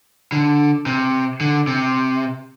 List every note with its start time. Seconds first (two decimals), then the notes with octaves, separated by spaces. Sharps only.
0.32 D3
0.86 C3
1.41 D3
1.67 C3